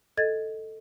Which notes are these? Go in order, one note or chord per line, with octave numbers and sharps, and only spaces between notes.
A4 D#5 G#6 A6